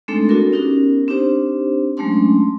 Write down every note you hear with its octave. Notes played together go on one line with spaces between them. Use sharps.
G#3 A3 C4 D4 D#4 A4
B3 D4 E4 F#4 A4 A#4
B3 C#4 D#4 G4 A#4
C4 D4 D#4 G4 C5
F#3 G#3 A3 C#4 D4 C6